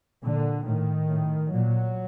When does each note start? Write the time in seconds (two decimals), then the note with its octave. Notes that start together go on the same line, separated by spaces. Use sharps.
0.23 A#2 D3
0.65 A2 D#3
1.09 A2
1.53 A#2 F#3